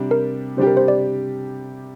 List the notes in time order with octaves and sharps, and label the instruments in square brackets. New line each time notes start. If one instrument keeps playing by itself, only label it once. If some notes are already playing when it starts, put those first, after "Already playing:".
Already playing: [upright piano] C3 G3 D4 G4
[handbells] A#4
[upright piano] C3 G3 D4 G4 [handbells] C5
[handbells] A#4
C5
D5